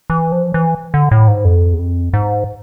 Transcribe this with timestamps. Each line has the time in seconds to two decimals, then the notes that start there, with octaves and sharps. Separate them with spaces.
0.10 E3
0.32 F3
0.54 E3
0.94 D3
1.11 A2
1.28 G#2
1.45 F2
1.73 E2
1.79 F2
2.13 G#2